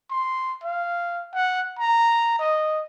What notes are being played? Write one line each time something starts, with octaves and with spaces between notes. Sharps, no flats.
C6
F5
F#5
A#5
D#5